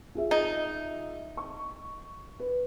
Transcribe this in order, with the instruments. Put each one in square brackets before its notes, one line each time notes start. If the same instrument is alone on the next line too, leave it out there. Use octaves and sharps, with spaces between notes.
[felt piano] F4 G#4 E5
[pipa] D#4
[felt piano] C#6
B4